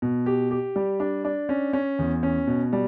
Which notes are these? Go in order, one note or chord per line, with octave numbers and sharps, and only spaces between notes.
B2
G4
G4
G3
D4
D4
C#4
C#4
E2
C#4
B2
G3